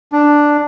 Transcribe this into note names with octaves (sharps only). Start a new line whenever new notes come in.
D4